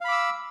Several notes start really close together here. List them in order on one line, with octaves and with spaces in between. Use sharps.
F5 B5 D6 E6